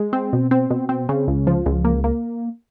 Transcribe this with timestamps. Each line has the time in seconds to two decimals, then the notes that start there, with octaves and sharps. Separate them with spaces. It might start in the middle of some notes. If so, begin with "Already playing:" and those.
Already playing: G#3
0.13 C4
0.33 B2
0.51 C4
0.70 B2
0.89 C4
1.09 C#3
1.28 C#2
1.47 F3
1.66 C#2
1.85 A#3
2.04 A#3